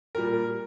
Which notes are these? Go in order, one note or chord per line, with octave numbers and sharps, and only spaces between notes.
A#2 G3 A#4